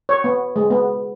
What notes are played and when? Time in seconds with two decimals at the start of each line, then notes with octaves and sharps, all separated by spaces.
0.09 C#5
0.24 B3
0.56 G#3
0.70 B3